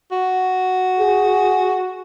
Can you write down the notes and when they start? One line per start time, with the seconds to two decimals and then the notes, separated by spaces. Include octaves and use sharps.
0.12 F#4
1.00 G#4